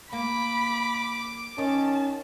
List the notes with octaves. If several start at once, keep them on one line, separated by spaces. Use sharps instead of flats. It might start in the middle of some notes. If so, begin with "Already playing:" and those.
A#3 B5 D6
D#3 C#4 A5